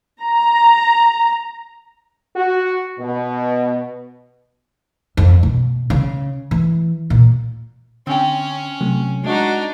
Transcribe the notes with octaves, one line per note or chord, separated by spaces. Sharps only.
A#5
F#4
B2
F2
B2
C#3
E3
A#2
D3 C4 C#4 G5
C3 F#3 A3
G#3 D4 D#4 F#4 D#5